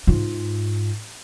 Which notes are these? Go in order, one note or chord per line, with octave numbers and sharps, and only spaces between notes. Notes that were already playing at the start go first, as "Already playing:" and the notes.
G#2 F4